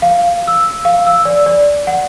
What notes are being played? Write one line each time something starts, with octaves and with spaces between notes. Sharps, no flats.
F5
E6
F5
E6
D5
D5
F#5